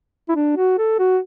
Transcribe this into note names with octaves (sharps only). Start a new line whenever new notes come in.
E4
D4
F#4
A4
F#4